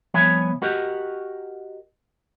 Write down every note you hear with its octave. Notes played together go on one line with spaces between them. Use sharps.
C2 F3 B3 C#5 E5 G#5
F#4 G4 A#4 D#5 F#5